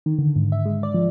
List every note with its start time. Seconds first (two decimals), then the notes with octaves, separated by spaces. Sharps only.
0.06 D#3
0.19 D3
0.36 G#2
0.52 E5
0.65 G#3
0.83 D5
0.94 F3